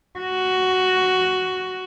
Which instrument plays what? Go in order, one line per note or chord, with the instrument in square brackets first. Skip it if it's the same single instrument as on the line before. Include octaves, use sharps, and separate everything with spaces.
[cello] F#4